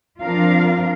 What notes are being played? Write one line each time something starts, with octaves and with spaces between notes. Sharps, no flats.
F3 C4 D4 F4 A#4 F5